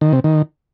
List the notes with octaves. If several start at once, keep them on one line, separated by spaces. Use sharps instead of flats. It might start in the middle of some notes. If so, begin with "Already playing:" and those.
D#3
C3
D#3